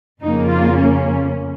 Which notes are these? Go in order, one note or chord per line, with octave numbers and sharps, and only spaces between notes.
F2 C#3 A#3 D#4
F4
C#4